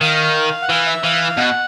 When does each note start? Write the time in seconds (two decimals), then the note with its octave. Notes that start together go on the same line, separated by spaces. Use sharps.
0.01 D#3 F5
0.62 F#5
0.69 E3 F5
0.87 E5
1.04 E3 F5
1.37 B2 F#5